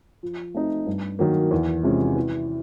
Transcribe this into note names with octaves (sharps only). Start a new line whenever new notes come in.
F3
A3 C4 D#4
G2
D#3 F#3 A#3
E2
C3 F3 G#3 C#4
E3